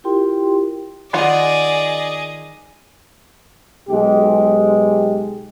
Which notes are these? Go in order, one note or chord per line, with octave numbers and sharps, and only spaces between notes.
E4 F4 G4 A#4 G5 C6
D#3 F4 G#4 D5 D#5 F#5
B1 G#3 G4